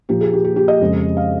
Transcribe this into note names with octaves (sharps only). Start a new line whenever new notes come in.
A#2 F3 A#3 G4
G#4
G4
G4
G4
D#5
F2 C#3 G#3
F5